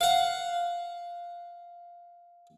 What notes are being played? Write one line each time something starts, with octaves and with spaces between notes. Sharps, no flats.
F5 F#5